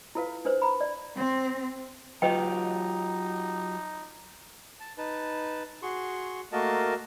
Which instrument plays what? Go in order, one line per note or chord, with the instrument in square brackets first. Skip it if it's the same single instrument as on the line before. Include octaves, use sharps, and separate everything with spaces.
[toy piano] E4 F4 A4 B4 F5
D4 A4 B4 C5
A#5 B5
D5
[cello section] C4
[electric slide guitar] F#3 F4 G4 [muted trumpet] D#4 [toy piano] B4 D#5 G5
[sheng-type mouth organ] A5
D#4 B4 A5
F#4 G#4 C6 C#6
A3 A#3 F#4 A#4 D#5 A5